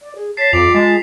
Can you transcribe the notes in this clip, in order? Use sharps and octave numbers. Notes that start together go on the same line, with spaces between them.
D5
G#4
C#5 A5 B6 C7
F2 F4 D5 F7
G#3 A5